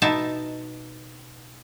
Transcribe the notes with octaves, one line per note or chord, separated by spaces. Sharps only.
B2 D#4 E5 A5